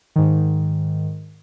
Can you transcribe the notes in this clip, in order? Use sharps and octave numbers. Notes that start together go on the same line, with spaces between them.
G#2 D#3